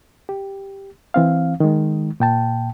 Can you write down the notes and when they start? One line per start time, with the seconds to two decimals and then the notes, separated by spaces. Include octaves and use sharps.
0.29 G4
1.14 E3 C4 F5
1.60 D#3 G#3
2.20 A#2 G5 A5